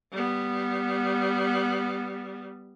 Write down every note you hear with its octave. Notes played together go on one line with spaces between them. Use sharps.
G3 B3